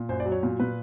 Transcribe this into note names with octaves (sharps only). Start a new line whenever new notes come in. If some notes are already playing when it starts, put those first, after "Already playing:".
Already playing: A#2
F#2 C5
D5
F#3
C#5
A#2
A#2 B4